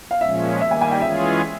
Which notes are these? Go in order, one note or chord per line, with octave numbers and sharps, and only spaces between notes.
F5
A#2 F3 G#3 C#4 E5
D#3 G3 A#3 E5
G#5
G#5
G5
E3 G#3 C#4 F4 G#4 E5